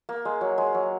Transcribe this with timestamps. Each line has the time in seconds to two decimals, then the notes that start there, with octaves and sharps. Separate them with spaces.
0.09 A#3
0.25 G#3
0.41 F#3
0.58 G#3
0.74 F#3